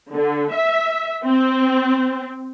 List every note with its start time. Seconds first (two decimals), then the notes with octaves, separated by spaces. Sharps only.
0.14 D3
0.53 E5
1.25 C4